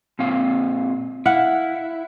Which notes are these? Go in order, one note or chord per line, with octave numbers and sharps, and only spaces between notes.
A#2 C4 F5
E4 F5 F#5